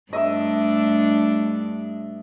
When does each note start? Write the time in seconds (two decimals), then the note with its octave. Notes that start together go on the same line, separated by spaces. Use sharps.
0.13 G2 A3 D4 D#5 E5 E6